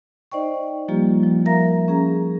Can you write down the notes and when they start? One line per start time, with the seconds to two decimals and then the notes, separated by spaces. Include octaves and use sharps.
0.32 D#4 C5 D5 D#5 G5 C#6
0.88 F3 G3 A#3 F4 G4
1.23 F3
1.46 A#4 E5 F5 A#5 A#6
1.88 C#4 G#4 A#5